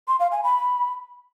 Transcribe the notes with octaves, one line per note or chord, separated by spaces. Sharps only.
C6
F5
G#5
B5